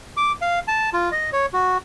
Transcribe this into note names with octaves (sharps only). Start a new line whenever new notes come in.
D6
F5
A5
F4
D#5
C#5
F#4